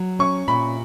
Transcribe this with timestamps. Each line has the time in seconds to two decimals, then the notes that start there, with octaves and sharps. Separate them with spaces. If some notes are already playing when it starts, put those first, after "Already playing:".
Already playing: F#3
0.19 C#4 C#6
0.48 A#2 B5